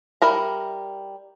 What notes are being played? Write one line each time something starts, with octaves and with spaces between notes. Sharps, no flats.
G3 E4 A#4 A#5